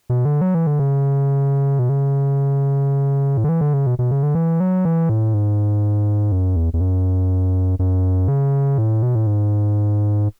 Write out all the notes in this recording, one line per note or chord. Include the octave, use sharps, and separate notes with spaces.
B2
D3
F#3
E3
D3
C#3
B2
C#3
A2
D3
E3
D3
C#3
B2
B2
C#3
D3
E3
F#3
E3
A2
G#2
F#2
E2
E2
F#2
F#2
C#3
A2
B2
A2
G#2